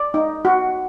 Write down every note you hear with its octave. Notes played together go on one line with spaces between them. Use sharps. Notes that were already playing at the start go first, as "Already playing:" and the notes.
Already playing: D5
D#4
F#4